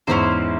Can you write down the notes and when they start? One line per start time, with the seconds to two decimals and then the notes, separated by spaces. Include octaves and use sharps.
0.07 E2 G#2 C#4 E4 C5